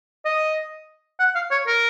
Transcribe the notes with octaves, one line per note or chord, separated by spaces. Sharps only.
D#5
F#5
F5
C#5
A#4